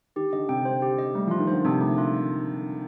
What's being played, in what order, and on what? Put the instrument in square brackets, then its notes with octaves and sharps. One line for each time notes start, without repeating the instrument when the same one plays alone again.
[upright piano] D#3 [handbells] G4
[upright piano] D3 [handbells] D#5
[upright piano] C3 [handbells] G5
[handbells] C5
G4
D#5
[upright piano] G3 [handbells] A3
[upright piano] F3 [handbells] F4
[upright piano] D#3
[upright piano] D3 [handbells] C5
[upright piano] C3 [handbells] D4
[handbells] A3
F4